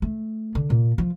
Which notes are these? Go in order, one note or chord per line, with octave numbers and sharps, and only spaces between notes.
A3
D3
A#2
F3